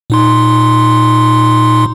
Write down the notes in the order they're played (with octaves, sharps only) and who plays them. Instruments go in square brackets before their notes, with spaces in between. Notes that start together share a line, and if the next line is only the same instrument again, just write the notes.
[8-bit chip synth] A#2 D#4 C6